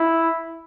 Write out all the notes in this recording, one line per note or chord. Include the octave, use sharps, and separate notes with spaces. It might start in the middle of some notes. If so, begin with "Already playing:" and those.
Already playing: E4